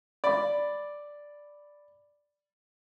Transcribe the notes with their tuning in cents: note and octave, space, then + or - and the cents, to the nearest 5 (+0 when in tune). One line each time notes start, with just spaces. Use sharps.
D5 +0 B5 +0